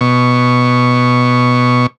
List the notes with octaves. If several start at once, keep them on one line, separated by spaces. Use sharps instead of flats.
B2 C#6